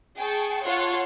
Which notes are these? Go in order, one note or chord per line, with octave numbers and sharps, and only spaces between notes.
G#4 G5 A5 C#6
F4 A4 C#5 F#5 C6